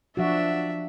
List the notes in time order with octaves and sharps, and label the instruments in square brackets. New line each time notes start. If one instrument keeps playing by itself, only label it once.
[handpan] F3 F#4 [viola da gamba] D4 [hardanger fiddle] E5